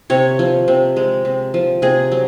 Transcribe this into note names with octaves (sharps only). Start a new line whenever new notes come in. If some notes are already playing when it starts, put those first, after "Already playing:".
C3 C#5
F3
C3
G#3
C3
F3
C3 G#4
F#3